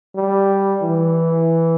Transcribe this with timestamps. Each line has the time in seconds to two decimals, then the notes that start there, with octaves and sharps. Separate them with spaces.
0.16 G3
0.82 E3